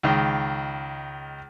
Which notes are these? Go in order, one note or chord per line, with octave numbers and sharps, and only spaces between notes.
C#2 D#3